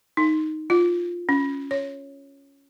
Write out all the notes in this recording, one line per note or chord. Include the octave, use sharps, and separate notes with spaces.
D#4
F4
C#4
C#5